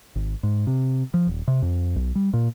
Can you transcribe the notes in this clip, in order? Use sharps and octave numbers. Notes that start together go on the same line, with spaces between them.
G#1
G#2
C3
F3
D#1
C3
F2
B1
G3
A#2